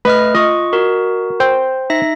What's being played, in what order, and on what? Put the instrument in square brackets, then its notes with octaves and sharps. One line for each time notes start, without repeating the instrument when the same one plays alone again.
[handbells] A3 D#5 F6 [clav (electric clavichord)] B4
[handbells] F4 C#6 [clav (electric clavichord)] D#5
[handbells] F#4 A#4
[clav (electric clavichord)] C5 G5
[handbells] D#4 E5 A#6